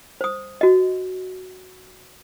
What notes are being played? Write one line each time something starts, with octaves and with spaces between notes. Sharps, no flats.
C5 D#6
F#4 D#5